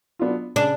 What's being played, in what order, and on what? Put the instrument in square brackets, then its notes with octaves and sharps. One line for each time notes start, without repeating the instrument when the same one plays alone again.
[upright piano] F#3 B3 D4 F4
[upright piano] C#3 [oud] D4